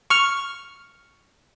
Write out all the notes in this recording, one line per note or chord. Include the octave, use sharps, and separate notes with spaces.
C#6 F6